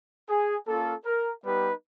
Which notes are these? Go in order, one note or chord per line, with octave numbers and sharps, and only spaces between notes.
G#4
A#3 C#4 F4 A4
A#4
G3 B3 D#4 G4 B4